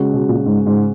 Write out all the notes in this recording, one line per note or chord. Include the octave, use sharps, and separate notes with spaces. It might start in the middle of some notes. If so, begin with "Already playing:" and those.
Already playing: C#3 G#3 C#4 F#4
B2
A#2
G#2
G#2